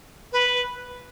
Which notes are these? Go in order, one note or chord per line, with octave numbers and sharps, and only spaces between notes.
B4